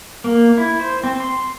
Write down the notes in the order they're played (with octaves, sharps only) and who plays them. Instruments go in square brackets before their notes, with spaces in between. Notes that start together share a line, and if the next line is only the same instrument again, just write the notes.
[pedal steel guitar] A#3
E4
C5
C4
C6